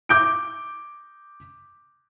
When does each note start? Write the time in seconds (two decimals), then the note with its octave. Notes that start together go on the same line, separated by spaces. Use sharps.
0.09 D6 G6 D7